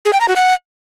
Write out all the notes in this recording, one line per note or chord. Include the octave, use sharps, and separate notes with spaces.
G#4
G5
A#5
F#4
F#5